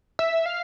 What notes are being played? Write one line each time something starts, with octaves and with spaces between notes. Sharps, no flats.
E5
F5